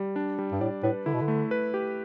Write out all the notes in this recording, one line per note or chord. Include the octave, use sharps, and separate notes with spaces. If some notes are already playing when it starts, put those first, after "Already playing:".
Already playing: G3
D4
G3
G2
A2 D5
A2 B4
D3 E4
B2
D3
A3
B4
G4